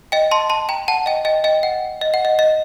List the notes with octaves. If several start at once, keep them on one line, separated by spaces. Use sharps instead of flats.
D#5 G5
A5 C6
A5 C6
G5 A#5
F#5 A5
D#5 G5
D#5 G5
D#5 G5
F#5
D#5
F#5
D#5
D#5